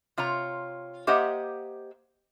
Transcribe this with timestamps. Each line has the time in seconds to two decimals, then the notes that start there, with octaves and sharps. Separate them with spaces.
0.18 C3 F4 C#5 A#5
1.07 A#3 G4 C5 D#5 E5 F#5